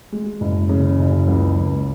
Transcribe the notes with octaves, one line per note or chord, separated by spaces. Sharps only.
G#3
F#1
C#3
F#1
C#2
C#2